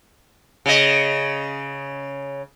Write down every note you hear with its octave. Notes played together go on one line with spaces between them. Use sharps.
C#3 D#5